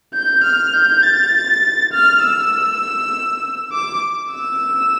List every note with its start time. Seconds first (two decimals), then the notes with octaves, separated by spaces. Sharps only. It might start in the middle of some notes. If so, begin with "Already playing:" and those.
0.14 G6
0.44 F6
0.74 G6
1.03 A6
1.93 F6
2.23 E6
3.72 D6
4.32 E6